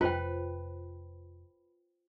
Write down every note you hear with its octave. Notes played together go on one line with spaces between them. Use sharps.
F1 F4 B4 C5 G5